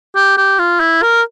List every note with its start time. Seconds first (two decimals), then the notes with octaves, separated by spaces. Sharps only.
0.16 G4
0.37 G4
0.59 F4
0.80 E4
1.02 A#4